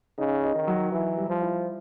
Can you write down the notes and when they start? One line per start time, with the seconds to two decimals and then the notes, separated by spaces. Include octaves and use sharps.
0.18 C#3 D#4
0.43 D#4
0.55 D#3
0.67 F#3
0.92 E3 E4
1.17 G3
1.29 F3
1.42 E4